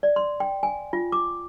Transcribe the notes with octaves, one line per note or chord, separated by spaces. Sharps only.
D5
C6
G5
G#5
F4
D6